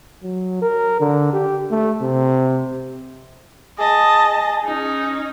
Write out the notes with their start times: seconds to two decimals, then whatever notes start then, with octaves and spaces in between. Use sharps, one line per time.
0.23 F#3
0.62 A#4
1.00 D3
1.33 G4
1.71 A3
2.02 C3
3.79 G#4 D#5 A5
4.64 C#4 D#4